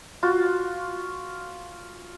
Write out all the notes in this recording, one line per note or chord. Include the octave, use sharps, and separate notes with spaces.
F4 F#4